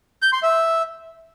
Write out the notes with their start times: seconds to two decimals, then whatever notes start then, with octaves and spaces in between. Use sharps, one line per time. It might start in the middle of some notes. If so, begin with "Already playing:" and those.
0.22 G6
0.33 C6
0.43 E5